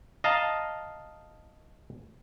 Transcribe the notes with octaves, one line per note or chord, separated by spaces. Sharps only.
D#5 F5 A5 A#5